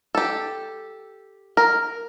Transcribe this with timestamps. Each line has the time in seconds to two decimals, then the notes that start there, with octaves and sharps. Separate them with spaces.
0.15 G4 A4
1.57 A#4